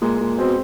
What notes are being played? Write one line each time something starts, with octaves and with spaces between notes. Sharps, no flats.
A#2 G#3
A#2
B2 C4